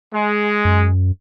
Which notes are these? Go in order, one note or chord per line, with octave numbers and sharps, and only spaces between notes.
G#3
F#2